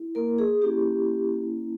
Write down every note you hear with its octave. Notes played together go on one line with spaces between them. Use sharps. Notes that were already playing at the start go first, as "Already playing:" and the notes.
Already playing: E4
A#3 A#4
G#4
A#3 C#4 E4 G4